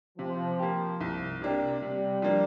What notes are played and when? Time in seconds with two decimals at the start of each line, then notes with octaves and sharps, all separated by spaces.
0.18 C3 F3
0.59 A#3 G4
1.01 C2
1.41 C3 A#3 D4 G4
1.82 C3 G3
2.22 F3 A#3 D4